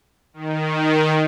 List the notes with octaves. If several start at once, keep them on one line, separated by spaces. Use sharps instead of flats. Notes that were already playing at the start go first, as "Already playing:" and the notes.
D#3